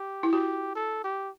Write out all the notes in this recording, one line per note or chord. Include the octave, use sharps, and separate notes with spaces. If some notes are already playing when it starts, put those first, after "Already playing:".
Already playing: G4
E4
F#4 G4
A4
G4